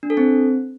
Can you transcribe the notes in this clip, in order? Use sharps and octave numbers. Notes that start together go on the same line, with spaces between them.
D4
A4
C4